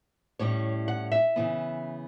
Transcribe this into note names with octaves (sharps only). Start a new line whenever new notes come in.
A2 G3 C#4 C#5
F#5
E5
C#3 E3 B3